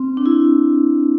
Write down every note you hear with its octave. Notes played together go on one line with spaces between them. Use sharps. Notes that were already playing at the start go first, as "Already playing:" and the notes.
Already playing: C4
D4
E4